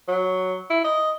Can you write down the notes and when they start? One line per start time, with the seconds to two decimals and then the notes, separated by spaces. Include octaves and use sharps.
0.08 F#3
0.70 E4
0.84 D#5